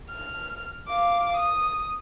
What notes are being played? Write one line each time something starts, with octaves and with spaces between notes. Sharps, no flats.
F6
F5 D6
D#6